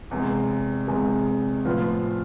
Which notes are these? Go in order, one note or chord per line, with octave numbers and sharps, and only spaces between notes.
E2 C3 G#3
E2 C3 G#3
A2 F3 B3 F4